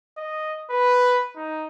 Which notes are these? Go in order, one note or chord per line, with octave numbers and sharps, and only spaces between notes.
D#5
B4
D#4